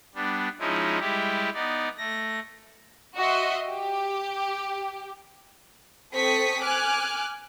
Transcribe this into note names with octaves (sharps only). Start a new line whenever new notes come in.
G3 B3 D4
F3 G#3 C#4 D#4 E4
G3 G#3 E4 G4
B3 D#4 D5
A3 A#6
F#4 D#5 E5 C6
G4
C4 A4 C#6 D#6 B6
G#5 D6 F6 F#6